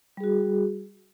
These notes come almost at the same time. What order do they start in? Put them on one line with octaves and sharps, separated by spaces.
G3 G#4 F#4